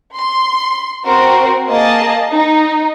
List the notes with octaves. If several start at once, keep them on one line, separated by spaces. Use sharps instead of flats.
C6
C4 F#4 A#4 C5
A#3 G#4 D#5 A5
D#4